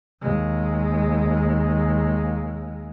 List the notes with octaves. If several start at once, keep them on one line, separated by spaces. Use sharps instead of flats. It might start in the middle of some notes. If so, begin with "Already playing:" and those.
D#2 G#3